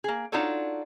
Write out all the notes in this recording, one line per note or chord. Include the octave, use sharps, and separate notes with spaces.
A#3 G#4
D4 D#4 F4 F#4 A4 C#5